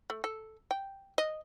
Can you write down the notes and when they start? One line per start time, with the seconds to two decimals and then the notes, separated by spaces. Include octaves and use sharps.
0.10 A3
0.24 A4
0.71 G5
1.18 D#5